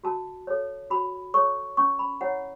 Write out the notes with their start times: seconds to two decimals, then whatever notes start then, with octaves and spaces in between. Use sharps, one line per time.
0.04 F#4 A5
0.47 A4 C#5
0.90 F#4 B5
1.34 A4 C#5 C#6
1.77 C#4 C#6
1.99 B5
2.21 E4 C#5 F#5